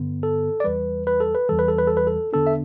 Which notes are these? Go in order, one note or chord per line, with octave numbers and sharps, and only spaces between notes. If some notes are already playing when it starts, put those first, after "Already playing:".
Already playing: G2 D3 B3
A4
D5
E2 E3 G3 B4
B4
A4
B4
E2 E3 G3 A4
B4
A4
B4
A4
B4
A4
E2 D3 B3 D4 A4
E5